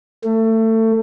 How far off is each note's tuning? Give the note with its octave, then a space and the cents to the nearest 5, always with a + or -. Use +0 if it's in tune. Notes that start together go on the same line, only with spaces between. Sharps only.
A3 +25